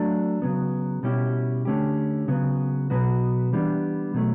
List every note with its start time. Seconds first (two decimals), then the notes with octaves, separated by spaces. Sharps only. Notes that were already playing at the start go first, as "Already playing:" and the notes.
Already playing: F#3 A3 D4
0.42 C#3 F#3 B3
1.03 B2 G3 C#4 E4 G4
1.65 D3 A3 C#4 G4
2.28 C#3 F#3 B3
2.90 B2 F#3 B3 F#4 B4
3.53 E3 G3 B3 D4
4.14 B2 F#3 A3